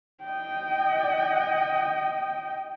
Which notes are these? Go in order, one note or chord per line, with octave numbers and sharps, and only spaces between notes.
D#5 G5